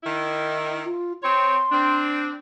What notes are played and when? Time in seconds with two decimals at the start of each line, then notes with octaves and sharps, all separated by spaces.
0.04 D#3 E4
0.85 F4
1.23 C4 C#5 C6
1.72 C4 D4